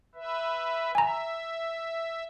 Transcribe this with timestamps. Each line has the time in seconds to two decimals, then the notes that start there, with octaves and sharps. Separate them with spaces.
0.15 B4 E5
0.95 E5 G#5 A#5